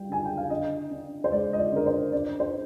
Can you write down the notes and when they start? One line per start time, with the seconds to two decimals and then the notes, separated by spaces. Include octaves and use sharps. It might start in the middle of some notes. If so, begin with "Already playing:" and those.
Already playing: G3 G5
0.09 D3 G#5
0.25 G5
0.37 F5
0.50 D3 D#5
0.91 D4
1.24 C5
1.32 G#3 D5
1.53 D#5
1.59 D5
1.72 D3 A#4
1.86 C5
2.12 D4 D5
2.40 C5